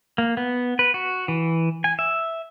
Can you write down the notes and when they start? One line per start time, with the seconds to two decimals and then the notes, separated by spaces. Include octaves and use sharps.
0.18 A#3
0.37 B3
0.79 B4
0.94 F#4
1.28 E3
1.84 G#5
1.99 E5